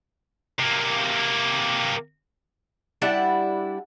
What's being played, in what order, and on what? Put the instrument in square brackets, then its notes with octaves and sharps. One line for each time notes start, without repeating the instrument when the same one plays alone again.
[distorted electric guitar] C3 A#3
[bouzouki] G3 D4 E4 F#5